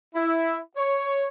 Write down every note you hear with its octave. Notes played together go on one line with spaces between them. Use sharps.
E4
C#5